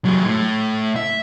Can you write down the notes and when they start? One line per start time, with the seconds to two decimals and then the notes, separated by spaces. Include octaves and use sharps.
0.05 F#3 G#3
0.26 A2
0.96 E5